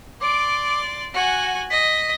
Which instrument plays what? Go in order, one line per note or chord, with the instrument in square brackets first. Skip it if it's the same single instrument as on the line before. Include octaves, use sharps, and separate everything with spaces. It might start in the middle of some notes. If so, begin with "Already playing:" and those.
[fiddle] D5 C6 [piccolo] D6
[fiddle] F#4 G#5 [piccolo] F#5
[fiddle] D#5 [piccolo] B6